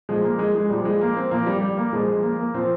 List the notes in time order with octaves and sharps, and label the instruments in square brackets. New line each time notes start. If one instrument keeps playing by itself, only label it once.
[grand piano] A#2 F3 G#3
A#3
G#3
G#3
A#2 F3 G3
G#3
A#3
C4
A#2 F3 A#3
G3
G3
A#3
A#2 F3 G#3
G#3
A#3
A#3
A#2 F3 C4